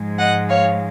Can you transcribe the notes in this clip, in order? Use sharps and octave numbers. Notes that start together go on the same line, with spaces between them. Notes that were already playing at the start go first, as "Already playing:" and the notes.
Already playing: G#2 F3 G#3
D#5 F#5
C#5 F5